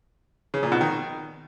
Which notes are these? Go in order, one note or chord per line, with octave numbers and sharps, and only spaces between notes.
C#3
A#2
B2
D#3